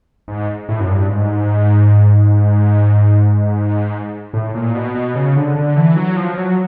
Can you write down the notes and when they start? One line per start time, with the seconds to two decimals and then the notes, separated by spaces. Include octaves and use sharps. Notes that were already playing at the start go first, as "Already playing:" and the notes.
0.28 G#2
0.69 A2
0.80 F#2
0.89 G2
1.09 G#2
4.34 A2
4.54 A#2
4.75 B2
4.95 B2
5.15 C#3
5.36 D3
5.56 D3
5.76 E3
5.96 F#3
6.16 F3
6.37 F#3